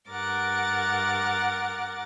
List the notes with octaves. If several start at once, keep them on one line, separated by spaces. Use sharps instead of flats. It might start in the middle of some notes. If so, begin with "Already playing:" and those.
G2 A#4 F#5 D6 A6